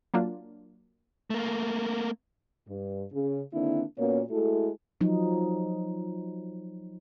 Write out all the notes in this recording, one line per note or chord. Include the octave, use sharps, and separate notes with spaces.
F#3 A#3 D4 F4
A3 A#3
G2
C#3
D3 D#3 A#3 C4 D4 E4
A#2 A#3 B3 C#4 F#4 C#5
G#3 A3 E4 F#4 A4
F3 F#3 D#4